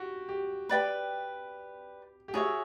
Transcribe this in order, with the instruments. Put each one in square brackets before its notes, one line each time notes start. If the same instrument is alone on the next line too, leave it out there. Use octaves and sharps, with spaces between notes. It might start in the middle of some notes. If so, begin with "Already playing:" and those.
Already playing: [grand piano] F#4 G4
G4
[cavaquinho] B4 D5 G5 B5
[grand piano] G4
[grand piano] F#4 [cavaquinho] G#4 C#5 E5